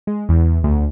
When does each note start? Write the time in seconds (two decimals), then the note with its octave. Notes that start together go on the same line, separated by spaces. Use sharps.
0.07 G#3
0.29 E2
0.64 D2